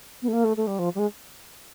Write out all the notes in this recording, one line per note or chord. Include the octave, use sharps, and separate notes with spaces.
B3
A3
A#3
A3
A3
G3
F3
G3
G#3